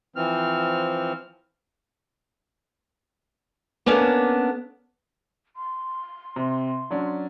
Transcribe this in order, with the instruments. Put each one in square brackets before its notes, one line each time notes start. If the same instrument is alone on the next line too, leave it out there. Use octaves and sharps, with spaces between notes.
[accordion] E3 F3 C4 F6
[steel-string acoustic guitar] A#3 B3 C#4 D4 A4 A#4
[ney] C6
[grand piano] C3
F#3 C#4 D4